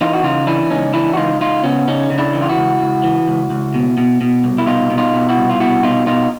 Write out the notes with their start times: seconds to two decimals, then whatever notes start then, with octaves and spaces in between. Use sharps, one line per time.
0.01 E3 D#4 F4
0.13 F#4
0.23 C#3 D#4 F4
0.47 E3 D4 E4
0.70 C#2 C#4 D#4
0.93 E3 D4 E4
1.13 F#4
1.17 C#2 D#4 F4
1.41 C#2 D#4 F4
1.64 C#3 B3 C#4
1.87 C#3 C#4 D#4
2.10 C#3
2.18 D4 E4
2.33 E3
2.42 F4
2.49 E4 F#4
2.57 C#2
2.81 C#2
3.04 E3
3.28 C#2
3.50 C#2
3.74 B2
3.98 B2
4.21 B2
4.44 C2
4.58 E4
4.66 B2 D#4 F4
4.90 B2
4.98 D#4 F4
5.14 B2
5.29 E4 F#4
5.37 C2
5.50 F4
5.60 B2 E4 F#4
5.83 B2 D#4 F4
6.07 B2 D#4 F4